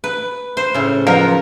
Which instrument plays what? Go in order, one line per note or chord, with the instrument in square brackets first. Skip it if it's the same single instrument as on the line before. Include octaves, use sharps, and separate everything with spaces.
[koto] B4
C5
A2 C#3
[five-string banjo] F3 B3 [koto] A#4